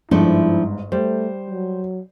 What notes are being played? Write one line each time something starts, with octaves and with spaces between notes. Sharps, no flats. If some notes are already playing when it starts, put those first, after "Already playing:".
G1 G#2 F3 A3 D4 E4
G3 A3 C5
F#3